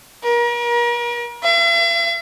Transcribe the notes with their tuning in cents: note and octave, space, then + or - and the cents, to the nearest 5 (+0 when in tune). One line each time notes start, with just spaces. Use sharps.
A#4 +40
E5 +45